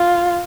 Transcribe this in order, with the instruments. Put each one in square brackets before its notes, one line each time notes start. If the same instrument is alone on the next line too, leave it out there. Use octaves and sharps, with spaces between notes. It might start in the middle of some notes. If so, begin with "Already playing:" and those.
Already playing: [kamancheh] F4